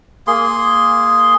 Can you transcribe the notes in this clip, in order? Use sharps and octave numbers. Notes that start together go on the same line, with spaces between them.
A#3 G#4 C6